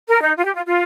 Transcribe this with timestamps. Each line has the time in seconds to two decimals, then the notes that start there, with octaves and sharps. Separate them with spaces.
0.09 A#4
0.23 D#4
0.37 F4
0.46 G4
0.55 F4
0.66 F4